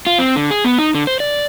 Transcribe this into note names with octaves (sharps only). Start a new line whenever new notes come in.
F4
C4
D3
G#4
B3
D#4
D3
C5
D5